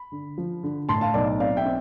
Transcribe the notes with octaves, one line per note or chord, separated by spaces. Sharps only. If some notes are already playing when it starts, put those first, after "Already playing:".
Already playing: B5
D3
F3
D3
A2 A5 C6
F5 A5
B1 D5
C4 D5 F5
E5 G5
C4